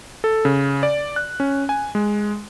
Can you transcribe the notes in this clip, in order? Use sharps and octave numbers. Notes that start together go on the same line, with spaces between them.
A4
C#3
D5
F#6
C#4
G#5
G#3